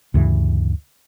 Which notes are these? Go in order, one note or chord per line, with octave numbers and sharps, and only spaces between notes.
D2 G2 C#3 E3